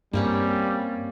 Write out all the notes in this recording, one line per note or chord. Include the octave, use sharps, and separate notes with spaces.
G2 G3 A#3 C4 C#4